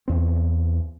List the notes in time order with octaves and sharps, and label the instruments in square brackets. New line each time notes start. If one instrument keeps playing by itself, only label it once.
[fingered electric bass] E2 C4